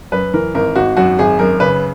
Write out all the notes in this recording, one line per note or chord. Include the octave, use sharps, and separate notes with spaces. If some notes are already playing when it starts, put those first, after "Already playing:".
F#2 B4
E3 A#4
G#1 A#4
G#1 F#4
F#2 F#4
G#1 G#4
F#2 A#4
C#3 B4